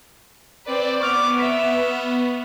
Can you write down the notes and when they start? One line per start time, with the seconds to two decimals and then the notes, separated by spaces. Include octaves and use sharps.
0.66 C4 B4 D5
1.01 B3 C#6 D6 F6 F7
1.40 E5 B6